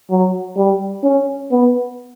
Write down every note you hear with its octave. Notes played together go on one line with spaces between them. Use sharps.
F#3
G3
C#4
B3